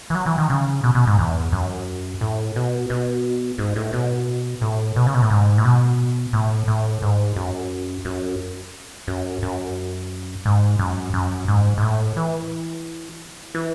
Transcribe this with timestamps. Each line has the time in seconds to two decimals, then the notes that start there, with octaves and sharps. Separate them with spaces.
0.10 E3
0.15 F#3
0.26 E3
0.38 D#3
0.50 C#3
0.84 B2
0.95 B2
1.07 G#2
1.18 E2
1.52 F#2
2.21 A2
2.56 B2
2.90 B2
3.58 G#2
3.76 A2
3.93 B2
4.61 A2
4.96 B2
5.07 C#3
5.14 B2
5.22 A2
5.30 G#2
5.58 A2
5.65 B2
6.33 A2
6.68 A2
7.02 G#2
7.36 F#2
8.05 F#2
9.07 F#2
9.43 F#2
10.45 G#2
10.79 F#2
11.14 F#2
11.48 G#2
11.78 G#2
11.82 A2
12.17 E3
13.55 E3